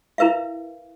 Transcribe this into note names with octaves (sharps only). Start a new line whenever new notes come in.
E4 A#4 B4 E5 F5